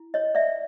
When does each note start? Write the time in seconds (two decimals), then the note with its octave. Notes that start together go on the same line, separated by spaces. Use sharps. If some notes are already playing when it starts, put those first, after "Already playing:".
Already playing: E4
0.14 C#5 D#5
0.35 D5 E5